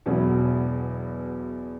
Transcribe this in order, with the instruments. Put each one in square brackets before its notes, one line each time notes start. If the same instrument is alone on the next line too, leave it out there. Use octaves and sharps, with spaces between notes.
[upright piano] E1 E2 B2 F#3 B3